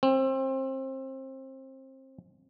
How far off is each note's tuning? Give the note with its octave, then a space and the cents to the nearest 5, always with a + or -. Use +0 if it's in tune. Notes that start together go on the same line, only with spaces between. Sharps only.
C4 +25